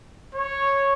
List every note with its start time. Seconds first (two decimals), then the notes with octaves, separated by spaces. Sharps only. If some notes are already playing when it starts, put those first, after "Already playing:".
0.35 C#5